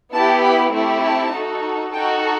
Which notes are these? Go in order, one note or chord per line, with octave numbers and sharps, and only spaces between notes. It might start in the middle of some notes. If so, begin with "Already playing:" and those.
B3 E4 G4 A5
B5
A3 C4 E4 G4
A5
D#4 F#4 A4
D#4 F#4 A4 G5